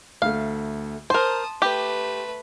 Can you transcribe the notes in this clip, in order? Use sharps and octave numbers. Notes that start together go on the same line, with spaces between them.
D2 A3 F5
A#4 C5 A5 C6 D#6
A3 G4 B4